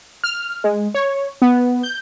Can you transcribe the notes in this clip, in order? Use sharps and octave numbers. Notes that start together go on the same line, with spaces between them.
F6
G#3
C#5
B3
G6